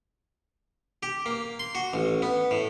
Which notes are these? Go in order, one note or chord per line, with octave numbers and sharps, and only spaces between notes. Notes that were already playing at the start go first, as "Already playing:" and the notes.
G4
A#3
C6
F#4
A1
B3
A2